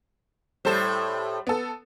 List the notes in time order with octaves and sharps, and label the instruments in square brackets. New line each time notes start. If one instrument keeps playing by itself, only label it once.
[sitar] A2 A4 C5 [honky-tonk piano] G3
[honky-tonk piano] B3 A4